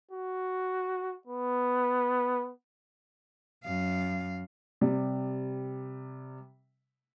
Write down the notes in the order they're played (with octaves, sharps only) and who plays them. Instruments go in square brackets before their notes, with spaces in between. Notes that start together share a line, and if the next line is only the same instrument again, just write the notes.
[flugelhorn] F#4
B3
[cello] F#2 F5
[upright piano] C3 G3